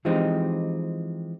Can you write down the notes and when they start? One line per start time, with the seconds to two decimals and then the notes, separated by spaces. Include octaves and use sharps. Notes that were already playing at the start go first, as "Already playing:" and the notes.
0.05 E3 F3 G#3 C4 D#4 G4